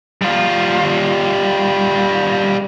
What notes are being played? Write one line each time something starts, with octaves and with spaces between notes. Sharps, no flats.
G3 F4